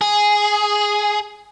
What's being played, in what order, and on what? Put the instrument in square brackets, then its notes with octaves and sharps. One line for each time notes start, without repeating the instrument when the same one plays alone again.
[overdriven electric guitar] G#4